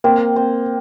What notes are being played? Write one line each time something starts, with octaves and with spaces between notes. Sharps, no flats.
A#3 C4
C4